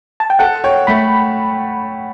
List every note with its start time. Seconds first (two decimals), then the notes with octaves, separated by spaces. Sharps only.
0.20 A5
0.30 G5
0.39 A4 F#5
0.64 C#5 G5
0.87 A3 B5